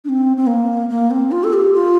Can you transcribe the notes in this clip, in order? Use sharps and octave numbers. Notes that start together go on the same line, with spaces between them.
D4
C4
C4
A#3
A#3
C4
F4
A4
G4
F4